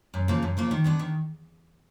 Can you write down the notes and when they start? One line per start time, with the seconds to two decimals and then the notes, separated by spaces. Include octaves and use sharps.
0.14 F#2
0.28 C#3 F3 A#3
0.42 F#2
0.57 C#3 F3 A#3
0.71 D#3
0.84 G#3 B3 D4
0.99 D#3